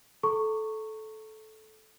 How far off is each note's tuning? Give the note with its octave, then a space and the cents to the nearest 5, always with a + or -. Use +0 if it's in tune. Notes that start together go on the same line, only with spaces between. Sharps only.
A4 -15 A#5 -40 C#6 +0